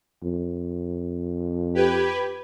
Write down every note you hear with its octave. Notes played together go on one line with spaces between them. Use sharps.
F2
G4 B4 G#6